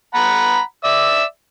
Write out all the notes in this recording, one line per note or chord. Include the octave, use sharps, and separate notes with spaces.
F#5 A#5 B5
D5 E5 E6